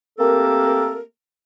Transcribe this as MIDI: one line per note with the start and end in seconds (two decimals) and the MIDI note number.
0.18 1.00 57
0.18 1.00 58
0.18 1.00 60
0.18 1.00 67
0.18 1.00 69
0.18 1.00 70